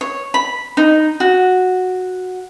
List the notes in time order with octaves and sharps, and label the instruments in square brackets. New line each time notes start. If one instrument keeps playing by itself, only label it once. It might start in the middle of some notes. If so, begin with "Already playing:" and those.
[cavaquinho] C#5
B5
D#4
F#4